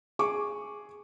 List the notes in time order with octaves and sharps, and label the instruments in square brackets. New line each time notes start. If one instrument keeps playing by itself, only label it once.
[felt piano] G#4 C#6 D6